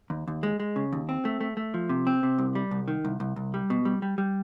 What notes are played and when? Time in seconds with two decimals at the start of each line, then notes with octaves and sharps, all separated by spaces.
0.10 D#2
0.27 D#2
0.43 G#3
0.60 G#3
0.76 C#3
0.93 D#2
1.09 C4
1.25 A3
1.41 A3
1.57 A3
1.74 F3
1.89 C3
2.07 C4
2.23 C3
2.38 C2
2.55 G3
2.71 C2
2.88 D#3
3.05 C2
3.20 C2
3.36 C2
3.54 G3
3.70 B2
3.85 G3
4.02 G3
4.18 G3